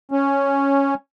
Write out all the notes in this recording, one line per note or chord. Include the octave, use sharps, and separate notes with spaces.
C#4